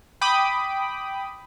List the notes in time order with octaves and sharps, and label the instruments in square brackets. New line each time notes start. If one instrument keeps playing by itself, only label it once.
[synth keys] G5 B5 D6 D#6